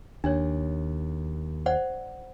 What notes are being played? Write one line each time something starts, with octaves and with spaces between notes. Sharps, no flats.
D#2 D4 C#5
C5 D5 F#5